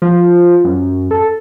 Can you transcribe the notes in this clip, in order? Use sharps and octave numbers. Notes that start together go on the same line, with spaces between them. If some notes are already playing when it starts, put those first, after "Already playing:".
F3
F#2
A4